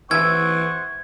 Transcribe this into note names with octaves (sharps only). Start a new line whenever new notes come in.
E3 E4 C5 F#5 C#6 E6 G#6